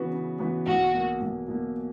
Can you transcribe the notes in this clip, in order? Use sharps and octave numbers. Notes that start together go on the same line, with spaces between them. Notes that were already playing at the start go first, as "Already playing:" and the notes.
Already playing: C#3 E3 B3 F#4 B4
C#3
E3 B3 F#4 B4
B1 F#4
B2 A#3
B1
B2 A#3